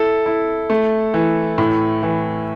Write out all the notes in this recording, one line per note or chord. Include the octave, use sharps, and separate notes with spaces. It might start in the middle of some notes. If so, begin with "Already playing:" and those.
Already playing: E4 A4
E4
A3
E3
A2
E3